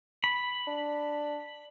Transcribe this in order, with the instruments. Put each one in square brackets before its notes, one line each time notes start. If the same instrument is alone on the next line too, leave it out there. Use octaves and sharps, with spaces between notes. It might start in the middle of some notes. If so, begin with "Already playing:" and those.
[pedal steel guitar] B5
[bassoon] D4